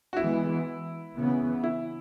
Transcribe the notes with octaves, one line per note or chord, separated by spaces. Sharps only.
F#4
E3 G#3 B3 E4
C#3 E3 B3
E4